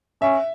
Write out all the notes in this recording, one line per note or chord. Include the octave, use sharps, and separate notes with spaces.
C#4 E5